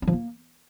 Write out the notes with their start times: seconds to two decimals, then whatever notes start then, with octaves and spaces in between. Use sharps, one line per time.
0.02 D4
0.07 F3
0.13 A#3